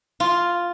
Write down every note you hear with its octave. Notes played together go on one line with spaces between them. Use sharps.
F4